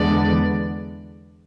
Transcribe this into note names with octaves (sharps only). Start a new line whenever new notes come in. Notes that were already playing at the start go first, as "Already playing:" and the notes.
Already playing: E2 D3 G#3 B3 D5